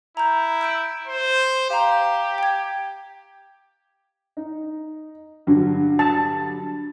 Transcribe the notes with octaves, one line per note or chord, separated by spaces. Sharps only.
E4 A#5 G6
E6 G6 D7
C5
G4 F5 A#5
G5 G#6
D#4
G2 D3 F#3
A5